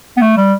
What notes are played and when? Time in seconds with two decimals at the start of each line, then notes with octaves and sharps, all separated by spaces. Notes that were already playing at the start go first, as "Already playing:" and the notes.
0.17 B3
0.22 A3
0.37 G3